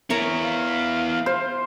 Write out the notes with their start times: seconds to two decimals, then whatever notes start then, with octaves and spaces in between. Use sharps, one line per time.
0.10 B3 E4 A#4 C#5 A#5
0.44 F5
1.26 C5